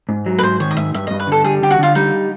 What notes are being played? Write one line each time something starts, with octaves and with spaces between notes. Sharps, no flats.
G#2
F#3
B4
G#2 C5
D#3 C#5
D#5
G#2 E5
G2 E5
G2 D#5
B4
D3 A4
G3 G#4
D3 G4
F#4
D3 F4
G3 D#4